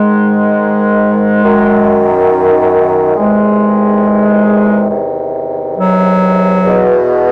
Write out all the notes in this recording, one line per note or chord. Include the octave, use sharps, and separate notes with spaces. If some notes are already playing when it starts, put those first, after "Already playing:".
Already playing: G#2 D#3 G#3
F#2 D#3
E2 C3 D#3 G#3
E2 C3 D#3
F#3
E2 B2